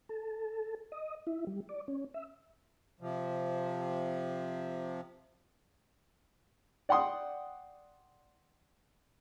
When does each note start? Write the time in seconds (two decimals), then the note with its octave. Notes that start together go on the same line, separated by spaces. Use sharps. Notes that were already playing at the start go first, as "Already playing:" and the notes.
0.09 A4
0.92 D#5
1.27 E4
1.47 G3
1.69 D5
1.88 C#4
2.14 E5
3.01 C3 F3
6.89 D5 F#5 G5 C6 D#6